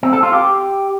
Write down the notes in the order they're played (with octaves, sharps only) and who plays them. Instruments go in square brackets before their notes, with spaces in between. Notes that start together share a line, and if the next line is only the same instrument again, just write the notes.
[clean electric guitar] C4
A4
F4
G4